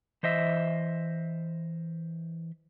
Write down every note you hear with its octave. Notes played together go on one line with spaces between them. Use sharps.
E3 C5 D#5 E5